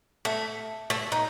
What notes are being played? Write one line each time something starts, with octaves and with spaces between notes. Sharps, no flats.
A3
A3
D#4